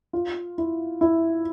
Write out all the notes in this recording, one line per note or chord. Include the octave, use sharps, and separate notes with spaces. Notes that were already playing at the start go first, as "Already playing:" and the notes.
F4
E4
E4